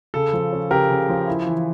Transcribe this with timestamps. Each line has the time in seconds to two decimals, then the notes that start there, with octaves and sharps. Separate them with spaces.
0.14 C#3 A4
0.33 F3
0.52 C#4
0.71 C#3 G4 A#4
0.90 C#3
1.09 F3
1.28 E4
1.46 E3